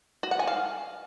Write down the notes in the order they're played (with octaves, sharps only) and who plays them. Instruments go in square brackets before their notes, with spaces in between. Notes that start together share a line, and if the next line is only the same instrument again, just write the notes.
[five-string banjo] F#4
F#5
G#5
F5